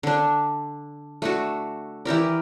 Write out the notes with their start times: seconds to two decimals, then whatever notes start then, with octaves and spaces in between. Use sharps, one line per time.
0.03 D3 D4
1.22 A3 D4 F#4
2.05 E3 G4 A#4 D5